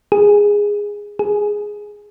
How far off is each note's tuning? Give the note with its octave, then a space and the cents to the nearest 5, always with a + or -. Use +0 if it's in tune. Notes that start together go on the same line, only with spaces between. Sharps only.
G#4 -10
G#4 +0